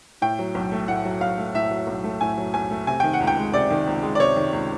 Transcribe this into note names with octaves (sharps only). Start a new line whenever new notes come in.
A2 G5
F#3
B1
A3
A2 F#5
F#3
B1 F5
A3
A2 E5
F#3
B1
A3
A2 G#5
F#3
B1 G#5
A3
C3 G#5
D#3 G5
F#5
C#2
G5
G#3
C3 D5
D#3
C#2
G#3
D5
C3 C#5
D#3
C#2